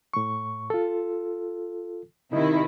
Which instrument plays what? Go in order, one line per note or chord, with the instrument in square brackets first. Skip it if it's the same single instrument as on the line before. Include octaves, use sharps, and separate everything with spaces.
[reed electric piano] A2 C#6
F4 A4
[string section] C3 D#3 E4 [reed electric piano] D#4